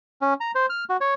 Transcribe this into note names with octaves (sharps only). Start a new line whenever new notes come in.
C#4
A#5
C5
F6
F#4
C#5